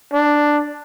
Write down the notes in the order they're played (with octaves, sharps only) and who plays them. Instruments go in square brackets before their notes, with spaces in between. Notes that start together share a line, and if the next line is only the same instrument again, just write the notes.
[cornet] D4